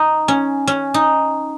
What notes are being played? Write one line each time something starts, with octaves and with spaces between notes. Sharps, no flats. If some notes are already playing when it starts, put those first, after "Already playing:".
Already playing: D#4
C#4
C#4
D#4